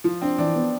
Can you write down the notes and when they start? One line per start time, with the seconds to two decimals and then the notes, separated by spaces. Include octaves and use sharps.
0.04 F3 F4
0.22 C4 D4
0.38 E3 D4
0.55 B3